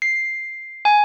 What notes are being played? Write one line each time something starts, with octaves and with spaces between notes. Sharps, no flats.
C7
G#5